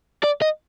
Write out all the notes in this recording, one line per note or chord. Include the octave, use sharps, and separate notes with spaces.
D5
D#5